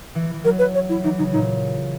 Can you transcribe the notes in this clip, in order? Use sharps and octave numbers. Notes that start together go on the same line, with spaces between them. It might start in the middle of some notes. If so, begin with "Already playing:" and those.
E3
E3
F#3 A#4
B4
C#5
E4
E3 D#4
C#3 D#4
A#2 D#4